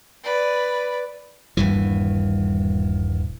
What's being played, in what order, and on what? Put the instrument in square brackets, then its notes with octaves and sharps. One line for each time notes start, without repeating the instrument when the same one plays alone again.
[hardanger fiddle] B4 D5
[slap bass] D#1 G2 E3